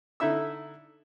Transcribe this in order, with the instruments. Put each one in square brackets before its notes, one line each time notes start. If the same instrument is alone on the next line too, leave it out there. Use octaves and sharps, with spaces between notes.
[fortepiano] D3 D#4 E4 E5 E6